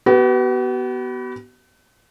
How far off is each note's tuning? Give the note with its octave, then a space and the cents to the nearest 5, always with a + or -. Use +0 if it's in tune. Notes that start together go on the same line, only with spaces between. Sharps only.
B3 +0 F#4 +45